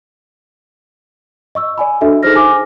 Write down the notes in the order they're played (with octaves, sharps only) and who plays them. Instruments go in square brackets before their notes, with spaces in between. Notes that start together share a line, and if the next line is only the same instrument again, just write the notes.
[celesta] D#5 C#6 E6
D5 G#5 B5
D4 F#4 A4 D#5 E5
D#4 G#4 A4 C5 F6 A#6
G4 C5 G#5 D6